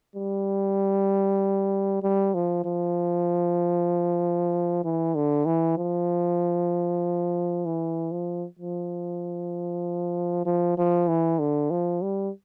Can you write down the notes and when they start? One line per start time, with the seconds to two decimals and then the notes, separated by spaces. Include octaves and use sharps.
0.15 G3
2.03 G3
2.34 F3
2.65 F3
4.84 E3
5.15 D3
5.46 E3
5.78 F3
7.65 E3
8.12 F3
8.59 F3
10.46 F3
10.78 F3
11.08 E3
11.39 D3
11.71 F3
12.02 G3